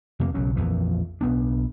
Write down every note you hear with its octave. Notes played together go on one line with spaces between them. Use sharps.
F2 C3 A#3
B1 C#3 F#3 C#4
A#1 F2 E3 F3
B1 B3 D4